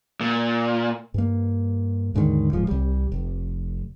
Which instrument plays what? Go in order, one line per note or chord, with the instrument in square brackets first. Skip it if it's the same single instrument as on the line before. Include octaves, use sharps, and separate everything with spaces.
[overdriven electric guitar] A#2
[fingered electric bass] G2 A#3
D#2 G#2 D3 D#3
D1 G#2 F3
C2 G3
F1